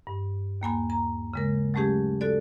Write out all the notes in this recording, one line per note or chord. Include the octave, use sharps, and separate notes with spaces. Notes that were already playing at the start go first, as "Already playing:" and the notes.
G2
D#2 A#3 G#5 B5
A#5
C#3 G#3 A#4
F#3 G#3 A3 C#4 G4 G#4
F#4 A4 D5